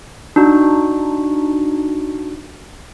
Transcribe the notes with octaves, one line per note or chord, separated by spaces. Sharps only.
D4 D#4 F#4